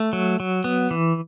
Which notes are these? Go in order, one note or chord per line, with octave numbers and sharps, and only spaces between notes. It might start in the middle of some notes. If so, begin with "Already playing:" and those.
Already playing: A3
F#3
F#3
B3
E3